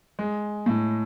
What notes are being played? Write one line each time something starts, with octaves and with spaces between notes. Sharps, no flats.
G#3
A2